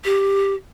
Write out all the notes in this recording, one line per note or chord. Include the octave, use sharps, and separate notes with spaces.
G4